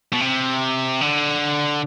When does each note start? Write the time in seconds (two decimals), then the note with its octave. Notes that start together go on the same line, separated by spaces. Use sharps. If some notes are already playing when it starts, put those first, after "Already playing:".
0.13 B2
0.20 C3
1.01 D3